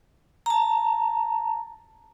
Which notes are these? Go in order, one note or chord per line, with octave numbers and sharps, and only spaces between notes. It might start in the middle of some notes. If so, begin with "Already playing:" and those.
A5 A#5